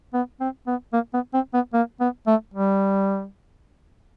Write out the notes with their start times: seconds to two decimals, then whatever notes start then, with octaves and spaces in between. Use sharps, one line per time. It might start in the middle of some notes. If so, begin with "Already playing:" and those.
0.13 B3
0.41 C4
0.67 B3
0.93 A#3
1.13 B3
1.34 C4
1.54 B3
1.73 A#3
2.00 B3
2.27 A3
2.54 G3